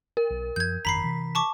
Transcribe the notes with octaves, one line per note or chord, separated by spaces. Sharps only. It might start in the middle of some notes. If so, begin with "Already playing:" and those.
A#4
B1
F#2 F3 G6 G#6
G1 F2 D#3 A#5 B5 B6 C7
C3 E3
A5 C#6 D6